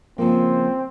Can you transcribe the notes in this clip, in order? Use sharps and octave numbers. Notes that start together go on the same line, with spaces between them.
C#3 F3 A#3 C4